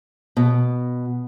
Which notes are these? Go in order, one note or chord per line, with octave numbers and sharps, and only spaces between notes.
B2